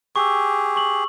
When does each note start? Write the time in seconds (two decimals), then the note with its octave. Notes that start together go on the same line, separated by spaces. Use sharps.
0.16 G4 G#4 C#6 E6
0.76 C#6 F#7